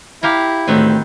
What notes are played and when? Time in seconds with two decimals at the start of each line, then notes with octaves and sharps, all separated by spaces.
0.23 E4 G4 F5 A#5
0.68 D2 A2 D#3 B3 C4